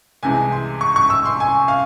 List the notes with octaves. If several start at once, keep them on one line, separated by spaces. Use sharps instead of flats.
C2 C3 E3 G#3 G#5
C6
C#6
C#6
E6
C6
G#5
F5